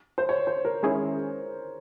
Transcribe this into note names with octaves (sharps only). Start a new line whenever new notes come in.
C5
C#5
C5
A#4
D#3 G#3 C#4 E4 G#4